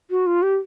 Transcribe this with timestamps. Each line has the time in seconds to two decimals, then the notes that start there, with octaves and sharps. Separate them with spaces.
0.10 F#4
0.26 F4
0.42 G4